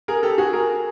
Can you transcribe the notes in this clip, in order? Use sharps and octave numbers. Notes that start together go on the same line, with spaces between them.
G#4 A#4
G4 A4
F#4 G#4
G#4 A#4